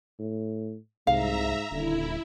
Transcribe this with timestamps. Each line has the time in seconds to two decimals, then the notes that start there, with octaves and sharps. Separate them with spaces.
0.19 A2
1.07 C2 G#2 E5 F5 A#5
1.72 D#1 D3 E4